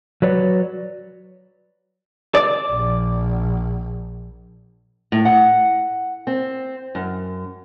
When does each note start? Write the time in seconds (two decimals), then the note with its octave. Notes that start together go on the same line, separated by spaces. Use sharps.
0.22 F#3 B4 C#5 D5
2.35 D5
2.71 A#1
5.12 A2
5.25 F#5
6.27 C4
6.95 F#2